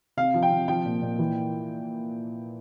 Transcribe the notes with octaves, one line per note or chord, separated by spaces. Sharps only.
C3 F5
F3
G5
C3
F3 G5
A#2
A#2
E3